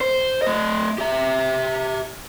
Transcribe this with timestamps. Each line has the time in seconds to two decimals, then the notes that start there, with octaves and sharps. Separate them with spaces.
0.01 C5
0.42 A3 D#5
0.98 G4 E5